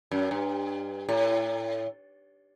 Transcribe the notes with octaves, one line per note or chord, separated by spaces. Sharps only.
F#2
G2
A2